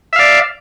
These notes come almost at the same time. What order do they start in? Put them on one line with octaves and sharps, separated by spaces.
E5 F5 D5